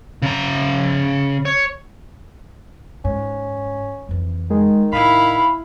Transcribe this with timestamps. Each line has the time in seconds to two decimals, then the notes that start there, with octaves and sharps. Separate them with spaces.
0.22 C#3 A#5
1.45 C#5
3.05 G#2 C#4
4.09 F2 E3
4.51 D#3 G#3
4.93 A2 E4 F5 B5